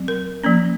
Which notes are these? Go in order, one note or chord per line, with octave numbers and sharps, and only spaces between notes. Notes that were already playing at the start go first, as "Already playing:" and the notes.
Already playing: F#3 C4
A#4
F3 A#3 C#4